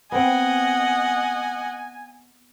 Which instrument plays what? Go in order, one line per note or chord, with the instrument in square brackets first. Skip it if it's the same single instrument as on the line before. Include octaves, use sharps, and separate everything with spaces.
[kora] B3 C4 [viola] D#5 F#5 [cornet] G#5